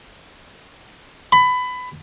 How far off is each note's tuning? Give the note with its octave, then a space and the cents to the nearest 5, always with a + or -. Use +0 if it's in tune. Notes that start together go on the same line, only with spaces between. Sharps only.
B5 +20